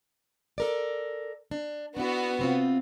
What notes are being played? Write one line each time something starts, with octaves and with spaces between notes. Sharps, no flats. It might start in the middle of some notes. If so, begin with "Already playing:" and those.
A4 A#4 D5
D4
B3 D4 E4 F#4
C3 C4 F4